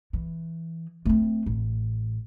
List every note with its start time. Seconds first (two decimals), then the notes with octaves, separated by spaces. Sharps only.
0.13 E3
1.05 A3 C4
1.46 A1